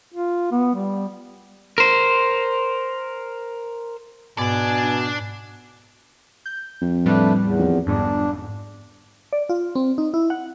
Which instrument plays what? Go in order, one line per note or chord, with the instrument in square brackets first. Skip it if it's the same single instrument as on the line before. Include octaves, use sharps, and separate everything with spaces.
[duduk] F4
B3
G3
[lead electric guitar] A#4 C5
[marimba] G#2 [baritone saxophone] B2 [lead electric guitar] D4 D5 [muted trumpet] G#5
[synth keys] G6
[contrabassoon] F2
[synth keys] A2 G3 F4 [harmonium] A3 D4 B4
[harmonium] E2
[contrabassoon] F2
[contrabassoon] G1 [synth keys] F2 G#2 [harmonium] D4
[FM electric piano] D5
F4
C4
D#4
E4
F#5